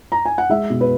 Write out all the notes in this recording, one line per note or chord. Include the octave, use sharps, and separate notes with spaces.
A#5
G#5
F#5
G#3 E5
B2
B4